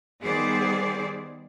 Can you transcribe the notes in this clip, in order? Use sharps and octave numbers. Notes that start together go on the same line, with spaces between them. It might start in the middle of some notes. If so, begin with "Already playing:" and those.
D#3 G3 B3 G#4 C5 D5